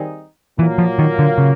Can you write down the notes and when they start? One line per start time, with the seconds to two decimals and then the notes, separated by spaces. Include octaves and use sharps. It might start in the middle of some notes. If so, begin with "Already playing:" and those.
Already playing: D#3 G3 C4 D#4 G#4
0.59 A#2 E3 F#3 A#3
0.78 F3
0.99 D#3
1.19 D3
1.38 C#3